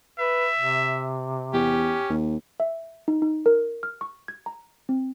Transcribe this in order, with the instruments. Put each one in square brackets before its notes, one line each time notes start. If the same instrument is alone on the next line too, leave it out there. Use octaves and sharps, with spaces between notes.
[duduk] B4 [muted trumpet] E5
[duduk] C3
[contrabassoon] E2 [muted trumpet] C#4 [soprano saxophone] G4
[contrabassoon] D#2
[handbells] E5
D#4
D#4
A#4
F6
C#6
G#6
A#5
C4